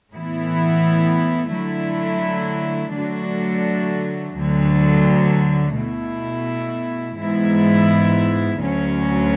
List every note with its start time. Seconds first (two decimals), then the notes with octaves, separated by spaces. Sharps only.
0.12 A2 E3 B3 E4
1.53 D3 F#3 A3 E4
2.94 D3 F#3 A3 D4 F#4
4.36 D2 D3 F#3
5.77 B2 A3 E4
7.18 G#2 E3 B3 E4
8.59 D2 D3 F#3 C#4